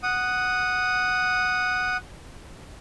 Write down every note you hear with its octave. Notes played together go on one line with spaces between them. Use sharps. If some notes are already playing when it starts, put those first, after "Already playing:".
F#5 D#6